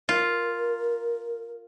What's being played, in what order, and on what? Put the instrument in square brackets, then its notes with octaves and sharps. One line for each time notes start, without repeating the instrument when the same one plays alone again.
[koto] F4 [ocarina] A#4